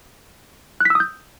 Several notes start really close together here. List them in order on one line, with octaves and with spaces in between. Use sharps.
F#6 B6 E6 D#6 G6